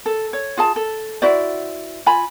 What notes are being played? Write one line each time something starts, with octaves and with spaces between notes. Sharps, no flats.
A4
C#5
F4 G#4 A5
A4
E4 F#4 C5 D5
F4 G#5 B5